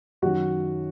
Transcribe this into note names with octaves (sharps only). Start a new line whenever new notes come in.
F#2 D#3 F#4 F#5